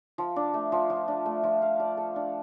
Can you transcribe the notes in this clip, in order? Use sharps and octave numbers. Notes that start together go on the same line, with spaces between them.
F3
D4
A3
F3
F3
D4
A3
F3
F5
D5
A4
D4